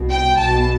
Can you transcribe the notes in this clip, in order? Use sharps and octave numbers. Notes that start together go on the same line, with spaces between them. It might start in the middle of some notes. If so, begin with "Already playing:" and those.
Already playing: C2 B2
G5
B1 B2 A5